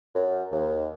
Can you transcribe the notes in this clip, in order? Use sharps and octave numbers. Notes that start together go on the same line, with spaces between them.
F#2
D#2